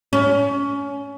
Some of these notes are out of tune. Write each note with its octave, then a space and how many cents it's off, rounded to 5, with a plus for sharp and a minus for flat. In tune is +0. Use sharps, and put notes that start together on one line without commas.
C#4 +25